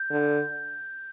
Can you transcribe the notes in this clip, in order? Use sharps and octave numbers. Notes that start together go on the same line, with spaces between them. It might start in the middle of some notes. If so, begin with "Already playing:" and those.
Already playing: G6
D3